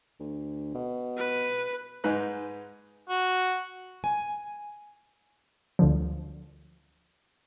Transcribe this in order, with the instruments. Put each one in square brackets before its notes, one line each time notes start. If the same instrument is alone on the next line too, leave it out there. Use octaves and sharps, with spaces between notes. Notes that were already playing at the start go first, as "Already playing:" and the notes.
[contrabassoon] D2
B2
[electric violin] B4
[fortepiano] G#2 G#3 D#4 B4 F#6
[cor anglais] F#4
[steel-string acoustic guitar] G#5
[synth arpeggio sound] D2 D3 F3